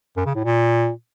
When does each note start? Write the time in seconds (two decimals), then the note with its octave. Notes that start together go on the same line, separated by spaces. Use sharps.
0.17 F#2
0.26 C#3
0.35 A2
0.45 A#2